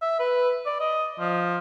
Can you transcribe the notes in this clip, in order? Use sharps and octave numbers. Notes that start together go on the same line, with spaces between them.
E5
B4
D5
D#5
F3